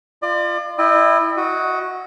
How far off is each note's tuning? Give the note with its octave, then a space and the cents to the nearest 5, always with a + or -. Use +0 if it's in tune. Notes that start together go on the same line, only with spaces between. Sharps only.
F4 -15 D5 +40
E4 +0 D#5 -40 G5 +0
F#4 +0 D#5 +25